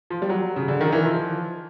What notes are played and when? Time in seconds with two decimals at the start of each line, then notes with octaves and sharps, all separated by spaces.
0.10 F3
0.22 G3
0.29 F#3
0.56 C#3
0.68 D3
0.81 D#3
0.92 E3
1.05 F3